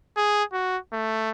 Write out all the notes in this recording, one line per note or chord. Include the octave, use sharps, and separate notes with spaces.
G#4
F#4
A3